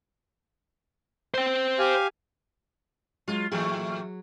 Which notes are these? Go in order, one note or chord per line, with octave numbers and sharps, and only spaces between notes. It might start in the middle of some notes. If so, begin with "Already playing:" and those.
C5 G5
G4 F5 G#5
F#3 G#3 F4
A2 E3 F#3 A3 G#4